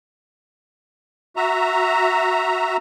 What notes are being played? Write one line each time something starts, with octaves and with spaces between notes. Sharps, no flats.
F#4 E5 A#5